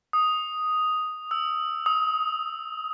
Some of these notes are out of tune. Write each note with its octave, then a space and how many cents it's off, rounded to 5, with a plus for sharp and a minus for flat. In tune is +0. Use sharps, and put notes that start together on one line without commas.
D#6 +0
E6 +5
D#6 +25